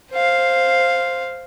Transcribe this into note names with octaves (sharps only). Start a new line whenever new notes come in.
C5 F5